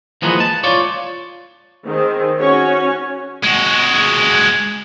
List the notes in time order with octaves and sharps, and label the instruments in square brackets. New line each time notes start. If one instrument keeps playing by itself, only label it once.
[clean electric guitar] E3 F3 G#3 A#3 B3
A5
F4 C#5 D5
[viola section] D#3 C4 G#4
C#4 F#4 C#5
[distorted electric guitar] G#3 F#4